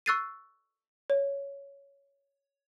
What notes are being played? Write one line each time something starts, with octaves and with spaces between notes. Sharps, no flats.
C#6 E6 F#6 A6 C7 D#7
C#5